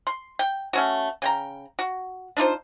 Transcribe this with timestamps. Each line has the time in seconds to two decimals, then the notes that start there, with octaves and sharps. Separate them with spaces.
0.07 C6
0.39 G5
0.73 A3 C#4 F#4
1.22 C#3 G5 A#5
1.79 F#4
2.37 D4 D#4 F4 C5